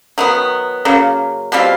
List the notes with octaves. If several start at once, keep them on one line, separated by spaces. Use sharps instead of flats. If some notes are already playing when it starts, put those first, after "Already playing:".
D#3 F#3 B3
C#3 F#3 A#3
B2 G3 C4 F4